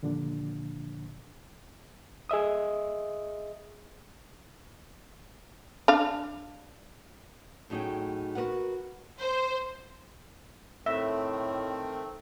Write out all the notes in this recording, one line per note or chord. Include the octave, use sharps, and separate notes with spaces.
D#2 A#2 D3 F3 D4
G#4 D#5 E5 D#6
D4 F5
A2 F#3 D#4 G#4 G5
F#4 G4 A#4 B4 F#5
C5
A2 D#3 A3 C4 E5